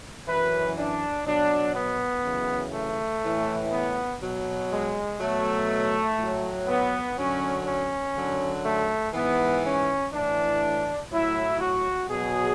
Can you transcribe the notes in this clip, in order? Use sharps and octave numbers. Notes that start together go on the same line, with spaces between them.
F#2 E3 B4
D4
B2 F#3 D4
B3
F#2 C#3 E3
A3
A2 E3
B3
B2 F#3
G#3
B2 F#3 A3
A2 F#3
B3
F#2 D3 F#3 C#4
C#4
F#2 D3 F#3
A3
G#2 E3 B3
C#4
A2 E3 D4
A2 F#3 E4
F#4
B2 F#3 G#4